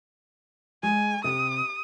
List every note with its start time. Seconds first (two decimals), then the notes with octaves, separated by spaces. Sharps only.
0.83 G#3 G#5
1.24 C3 D#6